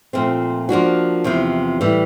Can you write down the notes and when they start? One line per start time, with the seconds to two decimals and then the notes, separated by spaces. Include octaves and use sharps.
0.13 A#2 F3 A3 C4
0.69 F3 A#3 D4 F#4
1.24 E2 C3 F3
1.81 A2 E3 G3